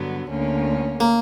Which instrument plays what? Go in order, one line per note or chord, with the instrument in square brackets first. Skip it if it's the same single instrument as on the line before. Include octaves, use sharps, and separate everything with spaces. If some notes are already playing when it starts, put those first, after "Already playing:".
Already playing: [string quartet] G2 D3 F#3 B3
D2 D3 A#3 C#4
[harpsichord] A#3